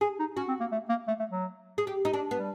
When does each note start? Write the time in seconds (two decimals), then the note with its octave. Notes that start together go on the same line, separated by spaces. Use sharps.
0.01 G#4
0.19 D#4
0.37 C#4 F#4
0.48 C4
0.60 A#3
0.72 A3
0.89 A#3
1.08 A3
1.19 A3
1.31 F#3
1.78 G#4
1.87 G4
2.05 D#4
2.14 D4
2.31 B3
2.38 G3